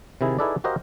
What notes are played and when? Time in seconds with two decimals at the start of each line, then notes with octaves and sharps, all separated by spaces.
0.21 C3 D#3 E4 G#4
0.39 D#4 E4 G#4 A4 B4 D5
0.64 F#4 G4 A#4 C5 D#5 F5